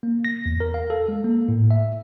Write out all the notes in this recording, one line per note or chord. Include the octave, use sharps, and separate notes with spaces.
A#3
A#6
E2
A#4
F5
A4
G#3
A#3
A2
E5